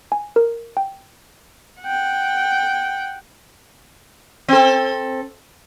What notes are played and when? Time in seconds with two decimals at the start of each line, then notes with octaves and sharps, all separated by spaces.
0.12 G#5
0.36 A#4
0.77 G5
1.82 F#5 G5
4.48 C4 A4